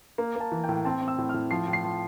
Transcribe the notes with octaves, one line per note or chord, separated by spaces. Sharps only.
A#3
A#3 A5
E3
G5
A2
C4 A5
C4
E6
A2
F6
A2
F3 C7
A2
C7
F3